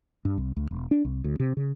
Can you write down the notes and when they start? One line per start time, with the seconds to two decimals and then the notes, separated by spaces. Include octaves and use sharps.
0.25 G2
0.38 C2
0.56 D2
0.71 E1
0.91 D4
1.05 C2
1.24 D2
1.40 C3
1.57 C#3